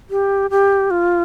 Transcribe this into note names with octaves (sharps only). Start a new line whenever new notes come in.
G4
G4
F4